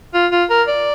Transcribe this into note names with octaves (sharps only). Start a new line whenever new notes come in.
F4
F4
A#4
D5